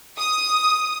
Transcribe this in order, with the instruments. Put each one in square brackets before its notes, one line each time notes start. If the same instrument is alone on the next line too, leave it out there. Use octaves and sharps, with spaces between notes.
[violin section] D#6